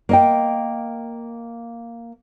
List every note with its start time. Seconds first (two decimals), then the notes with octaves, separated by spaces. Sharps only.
0.09 A#3 D#5 G5